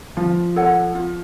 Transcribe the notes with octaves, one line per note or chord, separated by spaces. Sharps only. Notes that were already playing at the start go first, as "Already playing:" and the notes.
F3 F4
A4 C#5 F#5
F4